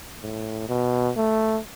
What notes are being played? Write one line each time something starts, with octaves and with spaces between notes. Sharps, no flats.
A2
B2
A3